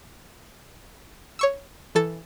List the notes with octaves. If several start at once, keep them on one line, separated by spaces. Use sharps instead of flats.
C#5 C#6 E6
E3 A4 A6